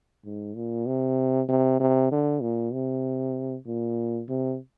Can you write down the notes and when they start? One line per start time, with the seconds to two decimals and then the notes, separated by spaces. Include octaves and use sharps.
0.25 G#2
0.56 A#2
0.87 C3
1.49 C3
1.80 C3
2.12 D3
2.42 A#2
2.73 C3
3.66 A#2
4.29 C3